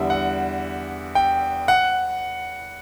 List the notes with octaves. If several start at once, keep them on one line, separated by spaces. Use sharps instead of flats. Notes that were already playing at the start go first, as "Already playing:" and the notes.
Already playing: E2 D3 G3 E5
F#5
G5
F#5